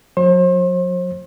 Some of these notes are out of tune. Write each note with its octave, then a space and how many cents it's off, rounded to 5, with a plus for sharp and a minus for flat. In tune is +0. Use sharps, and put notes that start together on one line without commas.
F#3 -35 C5 +40